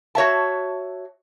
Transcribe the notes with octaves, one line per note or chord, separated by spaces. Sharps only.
F#4 C#5 E5 A5